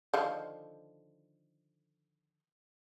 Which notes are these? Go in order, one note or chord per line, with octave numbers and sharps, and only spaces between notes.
D3 D#3 F3